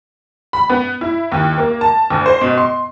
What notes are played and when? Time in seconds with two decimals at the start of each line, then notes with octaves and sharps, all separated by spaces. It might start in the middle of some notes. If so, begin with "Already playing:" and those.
0.53 B5
0.69 B3
1.01 E4
1.32 D#2
1.58 A#3
1.81 A5
2.10 D2
2.26 C5
2.41 B2
2.58 C6